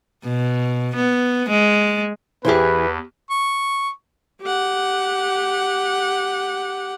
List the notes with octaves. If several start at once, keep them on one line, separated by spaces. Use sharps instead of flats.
B2
B3
G#3
E2 E3 E4 G4 G#4 B4 C5
C#6
G4 F#5